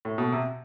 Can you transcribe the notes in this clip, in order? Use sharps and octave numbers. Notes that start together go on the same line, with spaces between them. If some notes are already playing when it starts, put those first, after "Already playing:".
A2
B2
C3